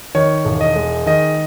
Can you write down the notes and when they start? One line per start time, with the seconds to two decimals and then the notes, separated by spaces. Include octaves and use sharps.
0.15 D#3 C#5
0.45 E1
0.61 D#5
0.76 G#3
1.06 D#3 D#5